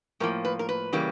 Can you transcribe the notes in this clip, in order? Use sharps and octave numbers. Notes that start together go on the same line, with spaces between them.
A2 F3 A#3 A#4
B4
A#4
B4
C#3 E3 G3 A#3